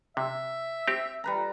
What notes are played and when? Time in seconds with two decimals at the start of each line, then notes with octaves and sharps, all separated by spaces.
0.17 C3 E5
0.88 C4 G4
1.24 G3 B4 A#5